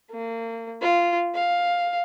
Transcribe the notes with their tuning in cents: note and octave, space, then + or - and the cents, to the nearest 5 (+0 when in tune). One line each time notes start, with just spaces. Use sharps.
A#3 -30
F4 -10
F5 +5